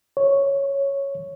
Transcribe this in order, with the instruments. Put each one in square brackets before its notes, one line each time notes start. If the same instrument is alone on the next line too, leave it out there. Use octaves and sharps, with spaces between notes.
[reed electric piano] C#5